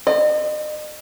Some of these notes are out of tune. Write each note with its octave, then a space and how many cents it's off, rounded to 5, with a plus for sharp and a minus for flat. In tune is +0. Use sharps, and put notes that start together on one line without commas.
D#5 -40